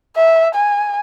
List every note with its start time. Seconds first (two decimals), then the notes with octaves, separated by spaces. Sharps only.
0.16 E5
0.54 G#5